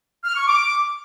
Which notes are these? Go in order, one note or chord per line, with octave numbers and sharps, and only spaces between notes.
F6
C#6
D6